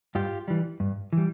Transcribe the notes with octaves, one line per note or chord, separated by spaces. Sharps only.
G2 F4 G4
E3 G3
G2
E3 G3